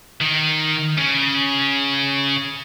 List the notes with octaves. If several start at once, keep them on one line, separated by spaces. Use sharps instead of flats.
D#3
C#3